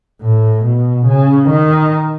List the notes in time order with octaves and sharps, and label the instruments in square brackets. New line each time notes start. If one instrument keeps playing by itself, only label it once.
[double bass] A2
B2
C#3
D#3